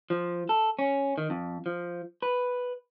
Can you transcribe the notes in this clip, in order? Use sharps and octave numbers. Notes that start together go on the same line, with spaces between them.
F3
A4
C#4
D#3
F2
F3
B4